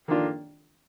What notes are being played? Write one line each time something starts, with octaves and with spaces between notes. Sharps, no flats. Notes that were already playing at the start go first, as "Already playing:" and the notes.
D#3 A#3 D4 F4